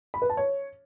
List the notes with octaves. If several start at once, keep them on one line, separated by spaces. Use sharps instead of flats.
B5
B4
A5
C#5